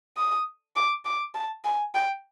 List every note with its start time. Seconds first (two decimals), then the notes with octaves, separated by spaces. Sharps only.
0.17 D#6
0.76 D6
1.05 D6
1.34 A5
1.64 G#5
1.95 G5